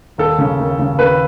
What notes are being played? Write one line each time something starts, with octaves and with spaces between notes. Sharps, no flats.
D#2 A4
C#3
D#2
C#3
D#2 B4